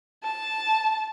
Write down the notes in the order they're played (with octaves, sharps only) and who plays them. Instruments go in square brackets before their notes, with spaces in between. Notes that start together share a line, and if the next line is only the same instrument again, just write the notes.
[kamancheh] A5